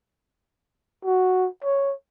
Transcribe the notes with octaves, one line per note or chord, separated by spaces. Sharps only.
F#4
C#5